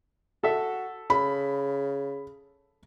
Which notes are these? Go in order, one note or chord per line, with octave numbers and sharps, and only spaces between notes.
F#4 A4 E5
C#3 B5